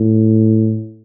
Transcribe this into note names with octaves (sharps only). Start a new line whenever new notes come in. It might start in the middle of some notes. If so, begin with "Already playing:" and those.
Already playing: A2